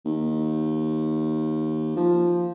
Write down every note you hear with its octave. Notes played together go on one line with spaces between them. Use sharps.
D#2
F3